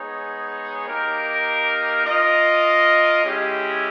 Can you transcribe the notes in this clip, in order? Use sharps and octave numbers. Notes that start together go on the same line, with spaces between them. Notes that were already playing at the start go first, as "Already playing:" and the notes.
Already playing: G#3 B3 D#4 G#4 C#5
A#3 D#4 G4 A#4
F4 A#4 D#5
G#3 C#4 E4 G4